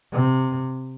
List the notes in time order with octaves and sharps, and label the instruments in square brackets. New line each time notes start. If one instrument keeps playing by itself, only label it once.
[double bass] C3